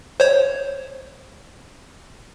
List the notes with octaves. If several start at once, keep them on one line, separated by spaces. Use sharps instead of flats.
C5 C#5